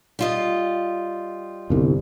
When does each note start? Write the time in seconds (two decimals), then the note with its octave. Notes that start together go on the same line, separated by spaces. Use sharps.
0.19 G3 F4 D#5
1.70 G1 C2